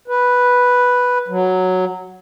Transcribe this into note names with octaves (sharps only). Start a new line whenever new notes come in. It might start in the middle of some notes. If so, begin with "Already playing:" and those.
B4
F#3